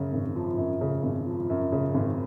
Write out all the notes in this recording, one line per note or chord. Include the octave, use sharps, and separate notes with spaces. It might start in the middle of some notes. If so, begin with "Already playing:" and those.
Already playing: F#2 C#3
G#1
F3
F#2
C#3
G#1
F3
F#2
C#3
G#1